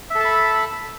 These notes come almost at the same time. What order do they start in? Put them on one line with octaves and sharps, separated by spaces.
E5 A4 A5 B5